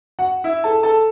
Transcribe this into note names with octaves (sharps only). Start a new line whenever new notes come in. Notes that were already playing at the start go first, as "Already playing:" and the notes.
F#4 F#5
E4 E5
A4 A5
A4 A5